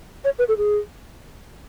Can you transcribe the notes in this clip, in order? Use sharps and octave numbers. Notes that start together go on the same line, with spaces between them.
C#5
B4
A4
G#4